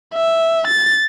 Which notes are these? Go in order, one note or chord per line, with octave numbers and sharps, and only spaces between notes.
E5
A6